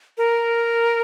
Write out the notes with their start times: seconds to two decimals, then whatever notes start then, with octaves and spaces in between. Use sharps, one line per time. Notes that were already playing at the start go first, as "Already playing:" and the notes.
0.18 A#4